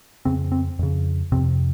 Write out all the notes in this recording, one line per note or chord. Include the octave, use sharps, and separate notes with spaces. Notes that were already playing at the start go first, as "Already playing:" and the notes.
F2 C#3 C4
C4
F2 C#3
F2 C3 C4